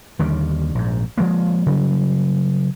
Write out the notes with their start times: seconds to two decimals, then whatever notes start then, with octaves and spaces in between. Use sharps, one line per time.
0.19 D#2 D3 D#3 G3
0.75 A#1 G#2
1.18 F3 F#3 G#3 A#3
1.66 C#3 F#3 G3